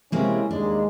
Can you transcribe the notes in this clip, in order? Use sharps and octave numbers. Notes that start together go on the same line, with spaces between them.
C3 G#3 A#3 C4 C#4 E4
D#2 G#3 D4